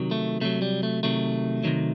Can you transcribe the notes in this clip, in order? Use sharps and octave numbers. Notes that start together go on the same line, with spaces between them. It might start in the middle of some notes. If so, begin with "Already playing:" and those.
Already playing: C3 D#3 F#3
A3
C3 D#3 F#3 A3
G3
A3
C3 D#3 F#3 A3
C3 D#3 F#3